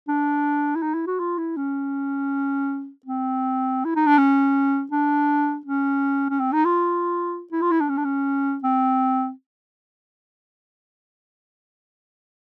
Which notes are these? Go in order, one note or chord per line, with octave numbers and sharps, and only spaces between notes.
D4
E4
D#4
E4
F#4
F4
E4
C#4
C4
E4
D#4
D4
C#4
D4
C#4
C#4
C4
D#4
F4
E4
F4
E4
D4
C#4
D4
C#4
C4